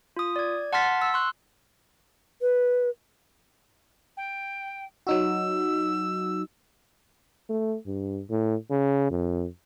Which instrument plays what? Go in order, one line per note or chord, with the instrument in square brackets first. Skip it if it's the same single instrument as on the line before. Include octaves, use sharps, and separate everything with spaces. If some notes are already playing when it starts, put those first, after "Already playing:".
[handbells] F4 D#6
D5 G#6
F#5 A5 C6 F6 A6 B6
E6
C6 C#6 F#6
[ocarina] B4
[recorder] G5
[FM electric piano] F#3 D#4 F#4 [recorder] E6
[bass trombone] A3
G2
A2
C#3
F2